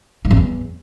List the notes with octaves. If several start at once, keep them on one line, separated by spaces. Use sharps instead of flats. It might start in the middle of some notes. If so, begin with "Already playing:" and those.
G#2
F#2
E2